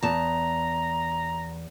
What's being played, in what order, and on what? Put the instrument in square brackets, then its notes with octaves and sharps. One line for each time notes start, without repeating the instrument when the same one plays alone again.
[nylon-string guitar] E2 A5 [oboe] A#5